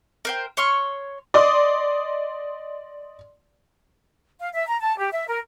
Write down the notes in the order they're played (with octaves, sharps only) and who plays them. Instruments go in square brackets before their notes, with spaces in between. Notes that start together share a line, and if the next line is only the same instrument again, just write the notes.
[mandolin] A#4 C5 G5
C#5 C6 C#6 F6
[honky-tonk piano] D5 D#5 C6 D#6
[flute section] F5
E5
A#5
A5
G4
E5
A#4